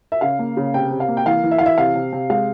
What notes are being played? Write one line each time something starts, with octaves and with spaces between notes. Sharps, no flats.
E5
C#3 F5
A#3
C#3
C3 G5
C3
F5
A#3
G5
E3 F5
E3
E5
E3 F5
E5
C3 F5
C3
C3
G#3 F5